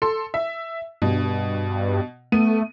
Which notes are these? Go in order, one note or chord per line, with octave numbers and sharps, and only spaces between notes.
A4 C6
E5
G2 B2
A3 B3 D#7